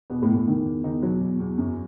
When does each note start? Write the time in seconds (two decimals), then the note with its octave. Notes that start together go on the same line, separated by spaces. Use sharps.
0.10 E2 B2 B3
0.22 A2 A3
0.28 E2
0.35 A2 A3
0.48 D#3
0.66 E2
0.84 E2 D#3 D#4
1.02 B2 F#3 F#4
1.21 E2
1.40 E2
1.58 F#2